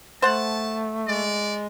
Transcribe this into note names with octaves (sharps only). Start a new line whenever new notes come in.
A3 C5 F#5 A5
G#3 D5